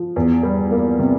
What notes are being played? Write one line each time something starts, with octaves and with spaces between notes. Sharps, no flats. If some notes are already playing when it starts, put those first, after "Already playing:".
Already playing: F3
E2
G3
A#3
C3